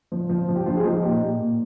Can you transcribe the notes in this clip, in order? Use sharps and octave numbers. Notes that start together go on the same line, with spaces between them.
F3
F3
F3
G4
F3 D4 F4
G#4
F3 D#4 G4
A#2 D#4 G4
A#2
A#2